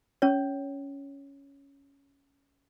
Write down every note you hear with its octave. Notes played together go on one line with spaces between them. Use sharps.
C#4 C#5